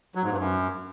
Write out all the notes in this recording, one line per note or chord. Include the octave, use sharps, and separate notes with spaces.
F#3
G#2
G2
F#2